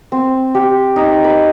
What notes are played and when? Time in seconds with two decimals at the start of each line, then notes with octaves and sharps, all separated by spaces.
0.12 C4
0.55 G4
0.96 D#4
1.24 B4